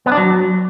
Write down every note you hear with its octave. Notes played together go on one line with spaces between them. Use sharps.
B3
D4
F#3